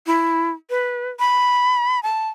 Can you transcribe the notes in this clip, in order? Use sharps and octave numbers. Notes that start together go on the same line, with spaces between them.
E4
B4
B5
A5